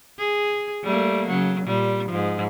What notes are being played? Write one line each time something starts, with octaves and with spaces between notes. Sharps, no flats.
G#4
G3 A3 A#3
C#3 F#3
A#2 G3
G#2 F3